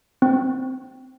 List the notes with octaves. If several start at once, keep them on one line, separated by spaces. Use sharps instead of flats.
C4